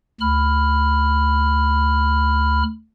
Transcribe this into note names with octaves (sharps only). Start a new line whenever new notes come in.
D2 B5 F6